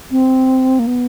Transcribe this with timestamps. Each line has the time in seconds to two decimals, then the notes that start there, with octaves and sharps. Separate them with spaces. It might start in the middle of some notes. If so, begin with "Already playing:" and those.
0.11 C4
0.79 A#3
0.87 B3